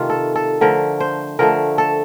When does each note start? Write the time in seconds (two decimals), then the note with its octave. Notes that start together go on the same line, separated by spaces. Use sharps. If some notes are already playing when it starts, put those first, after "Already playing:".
Already playing: C3 D#3 A3 F4
0.10 A4
0.36 A4
0.61 D3 F3 A3 A#4
1.00 C5
1.39 D3 F3 A3 A#4
1.78 A4